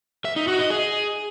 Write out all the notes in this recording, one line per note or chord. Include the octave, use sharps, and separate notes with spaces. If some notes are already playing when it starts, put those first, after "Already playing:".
E5
D#4
F#4
D#5
G#4